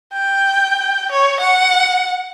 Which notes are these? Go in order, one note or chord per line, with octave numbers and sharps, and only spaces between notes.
G5
C#5
F#5